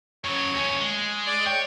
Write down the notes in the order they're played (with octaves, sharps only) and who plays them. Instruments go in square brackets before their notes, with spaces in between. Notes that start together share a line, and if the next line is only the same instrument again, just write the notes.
[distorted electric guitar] C#3 F#3 [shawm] C#5
[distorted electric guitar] D#2 C#4
G#3
[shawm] D5
[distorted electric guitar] C#5 [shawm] G5